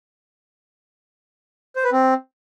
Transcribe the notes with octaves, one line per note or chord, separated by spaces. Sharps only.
C5
B4
C4